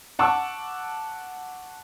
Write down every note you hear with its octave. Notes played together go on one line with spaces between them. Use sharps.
F#5 A5 C#6 D6 E6